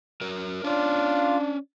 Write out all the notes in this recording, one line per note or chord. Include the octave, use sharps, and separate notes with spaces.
F#3 A#4
C#4 D4 F4 C#5 D5 F5